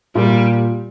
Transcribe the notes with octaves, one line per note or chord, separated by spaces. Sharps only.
A#2 G3